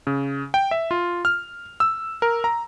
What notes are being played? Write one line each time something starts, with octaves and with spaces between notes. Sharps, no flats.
C#3
G5
E5
F4
F6
E6
A#4
A#5